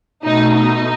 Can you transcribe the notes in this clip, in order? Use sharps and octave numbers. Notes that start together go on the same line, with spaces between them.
B2 A3 D#4
D#4